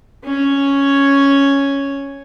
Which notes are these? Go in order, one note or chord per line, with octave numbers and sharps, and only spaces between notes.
C#4 C#5